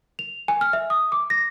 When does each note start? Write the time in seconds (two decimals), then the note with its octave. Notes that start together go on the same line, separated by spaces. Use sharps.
0.19 F7
0.48 G#5
0.61 F6
0.73 E5
0.90 D#6
1.12 D6
1.30 A#6